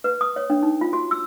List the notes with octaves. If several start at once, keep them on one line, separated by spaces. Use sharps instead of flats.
B4
D#6
C#5
D4
D#4
F4
F#4
E6